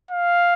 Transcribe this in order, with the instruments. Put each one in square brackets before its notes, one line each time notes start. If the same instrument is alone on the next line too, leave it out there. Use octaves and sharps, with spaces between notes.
[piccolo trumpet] F5